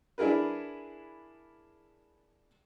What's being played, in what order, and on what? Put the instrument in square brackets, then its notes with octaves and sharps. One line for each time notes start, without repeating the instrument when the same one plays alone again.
[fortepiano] D4 E4 G#4 A#4 B4